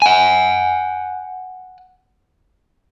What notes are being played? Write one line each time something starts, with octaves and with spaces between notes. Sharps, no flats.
F#5 G#5